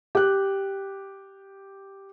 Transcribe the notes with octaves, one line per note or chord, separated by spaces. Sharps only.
G4 F#6